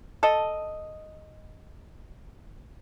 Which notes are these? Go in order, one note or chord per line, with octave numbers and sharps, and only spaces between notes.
A4 D#5